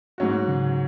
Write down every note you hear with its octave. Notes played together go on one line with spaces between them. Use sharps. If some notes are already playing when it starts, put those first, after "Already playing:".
G#2 F#3 C#4 F#4
C#3